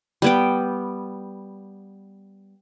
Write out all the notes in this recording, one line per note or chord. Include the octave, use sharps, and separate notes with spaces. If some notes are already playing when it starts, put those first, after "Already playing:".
G3 B3 G5